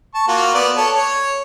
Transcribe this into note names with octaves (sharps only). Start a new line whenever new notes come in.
A5 C#6
A#3 F4 F#4
B3 D5
A4 C#5 A5
C#5